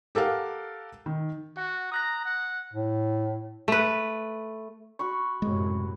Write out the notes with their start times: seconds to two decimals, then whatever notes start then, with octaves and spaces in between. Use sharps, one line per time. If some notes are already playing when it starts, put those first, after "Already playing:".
0.15 G4 A4 A#4 F5 F#5
1.06 D#3
1.57 F#4 F#5
1.92 A#5 D#6 F#6 A#6
2.25 F#5
2.73 A2
3.68 A3 B4
4.99 F#4 B5 C#6
5.42 F#2 A2 C3 G#3